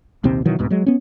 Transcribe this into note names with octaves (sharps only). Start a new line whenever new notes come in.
A#1 D#2 C3 C4
B2 D#3 E3 F#3
C2 G#2 B2
F#3 G#3
B3 C#4